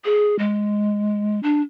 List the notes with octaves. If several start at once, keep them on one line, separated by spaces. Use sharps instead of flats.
G#4
G#3
D4